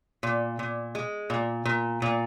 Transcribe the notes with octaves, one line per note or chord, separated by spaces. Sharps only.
A#2
A#2
G#3
A#2
A#2
A#2